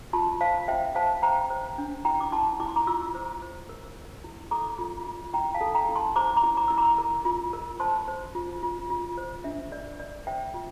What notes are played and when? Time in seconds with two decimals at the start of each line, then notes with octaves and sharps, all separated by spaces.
0.13 F4 A5 C6
0.41 C5 F5 A5
0.68 C5 E5 G5
0.95 C5 F5 A5
1.23 C5 G5 A#5
1.50 C5
1.78 D4
2.05 E4 G5 A#5
2.21 D6
2.32 E4 A5 C6
2.60 E4 D6
2.68 C6
2.76 A#5 D6
2.87 F4 C6 E6
3.15 C5
3.42 C5
3.69 A#4
3.96 A#4
4.24 E4
4.51 A4 A#5 D6
4.79 F4
5.06 F4
5.34 E4 G5 A#5
5.54 F5 A5
5.61 A4
5.75 G5 A#5
5.89 E4
5.96 A5 C6
6.16 C5 A#5 D6
6.36 A#5 D6
6.43 E4
6.57 A#5 D6
6.68 E4 E6
6.78 A#5 D6
6.98 A#4
7.25 F4
7.53 A#4
7.80 C5 A5 C6
8.08 C5
8.35 F4
8.63 F4
8.90 F4
9.18 C5
9.44 D4 E5
9.72 A#4 D5
9.99 A#4 D5
10.27 C5 E5 G5
10.54 F4